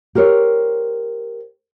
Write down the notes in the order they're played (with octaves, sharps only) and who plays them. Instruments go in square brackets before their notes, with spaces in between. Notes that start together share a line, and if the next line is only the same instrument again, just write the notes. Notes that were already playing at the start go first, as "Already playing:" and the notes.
[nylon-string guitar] G4 A#4 C5 C#5